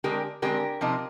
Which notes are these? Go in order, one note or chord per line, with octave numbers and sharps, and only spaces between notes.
D3 G#3 C4 G4 A#4
D3 G#3 C4 G4 A#4
C3 F3 C4 D#4